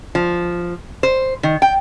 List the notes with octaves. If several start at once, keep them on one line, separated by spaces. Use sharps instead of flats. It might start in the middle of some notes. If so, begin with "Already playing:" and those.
F3
C5
D#3
G5